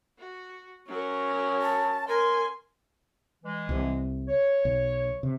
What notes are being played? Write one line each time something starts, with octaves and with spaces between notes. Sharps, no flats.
F#4
F#3 C#4 A#4
A5
A#4 G#5 C6
E3 G#3
C2 C3
C#5
B1
C3